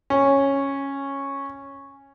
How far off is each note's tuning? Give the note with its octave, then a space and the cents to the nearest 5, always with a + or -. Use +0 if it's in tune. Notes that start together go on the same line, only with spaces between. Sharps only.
C#4 -10